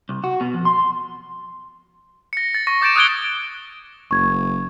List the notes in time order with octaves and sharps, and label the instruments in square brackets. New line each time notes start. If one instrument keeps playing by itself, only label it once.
[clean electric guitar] C2
F#4
B2
F2
C6
[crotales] A#6 C#7
A6
C#6 A#6
D6 G6 A6 D7 E7
D#6 E6 F#6 G#6 D7 G7
[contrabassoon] F#1 [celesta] C#6 G#6